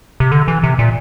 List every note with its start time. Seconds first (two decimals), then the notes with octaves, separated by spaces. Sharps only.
0.20 C3
0.32 D3
0.48 E3
0.63 C3
0.79 A#2